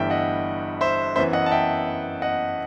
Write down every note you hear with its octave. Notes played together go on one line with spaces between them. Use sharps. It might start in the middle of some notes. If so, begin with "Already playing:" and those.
Already playing: G1 G2 E3 G3 E5 G5
D#5 F#5
C5 E5
F#2 E3 B3 C5 E5
D#5 F#5
A5
E5 G5
D#5 F#5